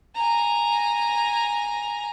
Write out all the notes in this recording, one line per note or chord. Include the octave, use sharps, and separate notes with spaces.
G#5 A#5